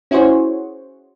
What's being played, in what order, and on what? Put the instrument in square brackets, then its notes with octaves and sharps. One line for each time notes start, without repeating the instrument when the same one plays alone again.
[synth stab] C#4 E4 F#4 G#4 C5 C#5